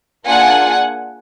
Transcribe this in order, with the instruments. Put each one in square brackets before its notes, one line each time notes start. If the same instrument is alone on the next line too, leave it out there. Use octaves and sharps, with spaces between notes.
[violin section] A#3 D4 F4 G#4 F#5 G#5